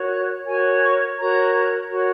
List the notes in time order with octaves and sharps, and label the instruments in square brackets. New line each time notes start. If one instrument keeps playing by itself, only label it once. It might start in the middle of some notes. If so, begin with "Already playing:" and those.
Already playing: [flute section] F#4 A#4 C#5
F#6
F#4 A#4 C#5 G#5
C#6
F#4 A#4 C#5 A#5
F#4 A#4 C#5